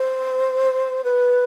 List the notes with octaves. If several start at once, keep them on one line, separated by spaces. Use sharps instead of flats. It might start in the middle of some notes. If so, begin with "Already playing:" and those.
Already playing: C5
B4